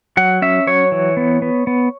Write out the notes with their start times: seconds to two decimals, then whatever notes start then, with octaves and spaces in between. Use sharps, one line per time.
0.17 F#3 F#5
0.42 C#4 E5
0.67 F#3 C#5
0.92 E3
1.17 B3
1.42 B3
1.67 B3